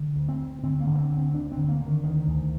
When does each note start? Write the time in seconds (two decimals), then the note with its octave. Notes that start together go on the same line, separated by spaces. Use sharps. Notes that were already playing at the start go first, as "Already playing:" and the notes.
Already playing: D3
0.16 D2
0.29 C4
0.39 D2
0.63 D3 C4
0.80 A#3
0.86 D3
0.94 A#3
0.98 C4
1.10 D2
1.17 C4
1.33 D2 D4
1.52 C4
1.57 D3
1.69 A#3
1.81 D3
1.86 D#3
2.04 D2 D#3
2.27 D2